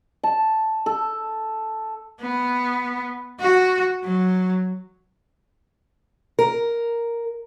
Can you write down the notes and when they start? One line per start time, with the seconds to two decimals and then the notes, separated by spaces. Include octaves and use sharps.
0.24 A5
0.86 A4
2.21 B3
3.40 F#4
4.04 F#3
6.39 A#4